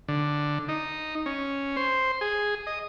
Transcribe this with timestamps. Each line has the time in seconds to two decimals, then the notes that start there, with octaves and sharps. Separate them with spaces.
0.08 D3
0.68 D#4
1.26 C#4
1.77 C5
2.21 G#4
2.67 D#5